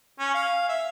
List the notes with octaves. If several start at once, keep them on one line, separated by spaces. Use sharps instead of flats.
C#4
F5
E5